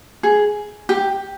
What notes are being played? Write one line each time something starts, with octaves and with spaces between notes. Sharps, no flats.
G#4
G4